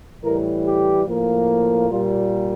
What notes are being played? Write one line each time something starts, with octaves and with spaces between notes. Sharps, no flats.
A2 E3 G3 A#4
G4
A2 F3 A#3
A#2 G3 A#3 F4